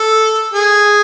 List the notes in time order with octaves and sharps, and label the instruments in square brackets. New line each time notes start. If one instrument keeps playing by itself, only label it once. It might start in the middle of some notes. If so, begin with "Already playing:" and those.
Already playing: [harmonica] A4
G#4